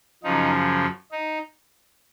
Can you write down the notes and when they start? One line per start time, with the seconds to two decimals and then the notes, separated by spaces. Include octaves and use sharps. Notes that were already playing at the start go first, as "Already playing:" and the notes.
0.23 F#2 C#3 F3 D#4
1.11 D#4